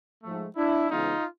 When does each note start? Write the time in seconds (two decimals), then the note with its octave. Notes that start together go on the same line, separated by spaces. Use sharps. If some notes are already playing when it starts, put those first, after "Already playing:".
0.23 G#2 F3 A3
0.56 D4 E4
0.90 C#3 E3 G#3 B3 D#4 F4